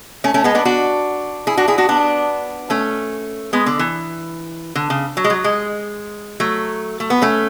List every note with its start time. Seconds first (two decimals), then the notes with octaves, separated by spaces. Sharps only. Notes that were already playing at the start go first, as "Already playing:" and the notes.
0.24 A3 C#4
0.34 A3 C#4
0.44 G#3 B3
0.55 B3 D4
0.65 D4 F#4
1.47 E4 G#4
1.57 D4 F#4
1.68 E4 G#4
1.78 D4 F#4
1.89 B3 D4
2.70 A3 C#4
3.53 G#3 B3
3.66 D3
3.79 E3
4.75 D3
4.90 C#3
5.17 F#3
5.24 G#3
5.30 F#3
5.44 G#3
6.40 F#3 A3
7.00 A3
7.10 B3
7.22 A3 C#4